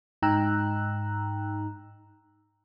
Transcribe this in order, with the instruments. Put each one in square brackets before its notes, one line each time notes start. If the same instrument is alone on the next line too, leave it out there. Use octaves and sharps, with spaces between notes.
[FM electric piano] G#2 D#4 G5 A#5 E6 F#6